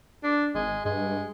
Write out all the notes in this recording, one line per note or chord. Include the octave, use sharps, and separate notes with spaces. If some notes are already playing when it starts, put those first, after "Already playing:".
D4
G#1 G#3
G2 G#3